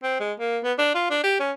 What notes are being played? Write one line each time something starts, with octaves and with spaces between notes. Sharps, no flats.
C4
G#3
A#3
B3
D4
F4
D4
G4
C#4